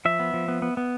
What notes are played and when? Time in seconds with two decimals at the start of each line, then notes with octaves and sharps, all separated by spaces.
0.05 F3 E5
0.19 B3
0.34 F3
0.48 B3
0.62 B3
0.77 B3